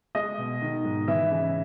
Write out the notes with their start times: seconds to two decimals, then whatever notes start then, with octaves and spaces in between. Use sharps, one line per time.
0.15 G#3 D#5
0.38 B2
0.61 D#3
0.84 G#2
1.08 E3 E5
1.31 C#3